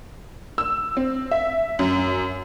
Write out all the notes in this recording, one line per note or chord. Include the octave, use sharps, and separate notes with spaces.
E6
C4
E5
F#2